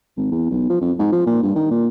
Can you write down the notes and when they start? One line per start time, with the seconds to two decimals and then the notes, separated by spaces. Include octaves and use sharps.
0.17 G#1
0.31 E2
0.50 B1
0.69 F3
0.81 F2
0.99 G#2
1.12 F3
1.26 A#2
1.42 G2
1.56 D#3
1.71 A#2